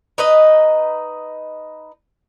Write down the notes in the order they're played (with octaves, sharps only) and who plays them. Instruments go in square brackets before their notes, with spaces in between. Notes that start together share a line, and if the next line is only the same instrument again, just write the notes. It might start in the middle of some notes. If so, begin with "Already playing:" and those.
[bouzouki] D#4 B4 D#5